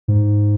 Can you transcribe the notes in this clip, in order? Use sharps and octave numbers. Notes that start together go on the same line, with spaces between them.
G#2